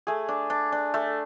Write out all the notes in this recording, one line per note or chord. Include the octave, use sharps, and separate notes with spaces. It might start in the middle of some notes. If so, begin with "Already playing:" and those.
A3 G#4
D4
D4
D4
A3